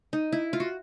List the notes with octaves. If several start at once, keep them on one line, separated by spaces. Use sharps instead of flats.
D#4
E4
F4
F#4